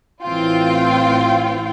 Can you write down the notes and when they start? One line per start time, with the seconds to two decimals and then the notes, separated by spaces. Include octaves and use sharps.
0.23 A1 E3 C4 F4 G5